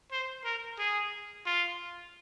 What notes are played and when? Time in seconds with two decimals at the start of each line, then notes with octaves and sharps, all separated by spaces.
0.12 C5
0.45 A#4
0.79 G#4
1.46 F4